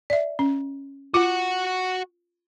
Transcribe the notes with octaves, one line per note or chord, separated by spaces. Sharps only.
D5 E5
C#4
F4 F#4 F#5